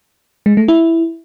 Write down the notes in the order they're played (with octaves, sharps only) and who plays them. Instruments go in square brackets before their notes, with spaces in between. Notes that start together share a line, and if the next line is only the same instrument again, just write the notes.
[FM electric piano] G#3
A3
E4